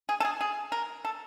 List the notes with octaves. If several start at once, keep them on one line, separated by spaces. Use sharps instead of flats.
G#4
A4
G#4
G#4
A#4
A4